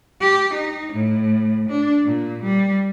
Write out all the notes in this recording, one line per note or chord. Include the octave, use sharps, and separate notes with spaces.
G4
D#4
A2
D4
A#2
G3